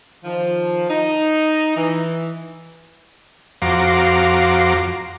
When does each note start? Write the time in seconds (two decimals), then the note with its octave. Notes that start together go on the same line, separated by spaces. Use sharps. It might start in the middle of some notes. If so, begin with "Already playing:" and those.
0.24 D#3 F3
0.89 D#4
1.77 E3
3.62 F2 F#4 F5 A#5 C6 D6